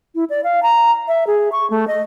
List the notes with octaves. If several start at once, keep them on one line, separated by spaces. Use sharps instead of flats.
E4
D5
F5
A#5
E5
G#4
C#6
A3
D#5